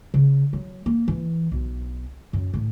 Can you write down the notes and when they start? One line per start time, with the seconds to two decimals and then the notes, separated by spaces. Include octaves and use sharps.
0.14 C#3
0.53 F#3
0.86 A#3
1.08 E3
1.52 B1
2.33 F#2
2.54 A2